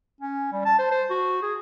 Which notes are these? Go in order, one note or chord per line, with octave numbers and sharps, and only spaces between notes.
C#4
G3
A5
C5
C5
F#4
G#4